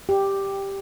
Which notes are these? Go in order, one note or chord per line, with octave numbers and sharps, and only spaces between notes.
G4